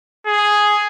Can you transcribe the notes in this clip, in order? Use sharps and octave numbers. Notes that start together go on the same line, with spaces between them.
G#4